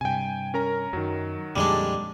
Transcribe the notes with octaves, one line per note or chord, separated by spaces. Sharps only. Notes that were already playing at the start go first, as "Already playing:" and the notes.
G2 C3 G5 G#5
C#4 A#4 A#5
F#2 D#3 F#3
F2 A#2 D3 G3 G#3 D4